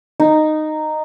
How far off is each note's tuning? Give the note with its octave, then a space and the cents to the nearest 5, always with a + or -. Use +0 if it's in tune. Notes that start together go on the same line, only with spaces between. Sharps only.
D#4 -10